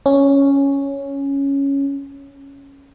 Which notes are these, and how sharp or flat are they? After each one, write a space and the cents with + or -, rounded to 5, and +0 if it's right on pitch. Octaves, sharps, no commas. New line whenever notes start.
C#4 +0